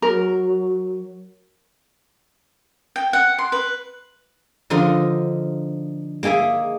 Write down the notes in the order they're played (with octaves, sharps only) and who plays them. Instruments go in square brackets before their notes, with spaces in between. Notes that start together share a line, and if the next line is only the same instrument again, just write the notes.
[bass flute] F#3 [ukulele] A#4
[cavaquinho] G5
F#5
C6
B4
[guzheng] D3 F3 D#4 A#4
A#3 D#4 G#4 E5 G#5